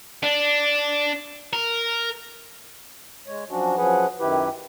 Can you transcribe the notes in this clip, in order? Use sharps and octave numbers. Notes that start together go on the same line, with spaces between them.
D4
A#4
G#3 C#5
F3 F#3 C#4 D4 F#4
F3 F#3 C#4 G#4 B4 F#5
F#2 D#3 E4 G4 B4